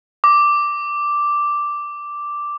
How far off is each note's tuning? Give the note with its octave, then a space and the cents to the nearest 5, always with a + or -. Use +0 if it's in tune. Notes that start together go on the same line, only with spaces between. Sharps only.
D6 +0